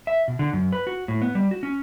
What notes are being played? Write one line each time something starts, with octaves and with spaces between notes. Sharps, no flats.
E5
B2
D3
F#2
B4
F#4
A2
B3
G3
F#4
C#4